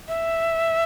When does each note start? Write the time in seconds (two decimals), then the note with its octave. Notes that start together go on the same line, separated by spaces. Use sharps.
0.08 E5